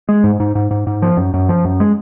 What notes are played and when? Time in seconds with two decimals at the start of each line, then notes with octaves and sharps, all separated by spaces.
0.09 G#3
0.24 G#2
0.40 G#2
0.55 G#2
0.71 G#2
0.87 G#2
1.02 F3
1.17 F#2
1.34 F#2
1.49 F3
1.65 F#2
1.80 G#3